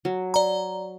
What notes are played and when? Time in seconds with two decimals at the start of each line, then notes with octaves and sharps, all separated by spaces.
0.05 F#3
0.34 D5 A#5